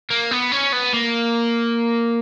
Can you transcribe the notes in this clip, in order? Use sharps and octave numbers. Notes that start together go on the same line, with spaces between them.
A#3
B3
C#4
B3
A#3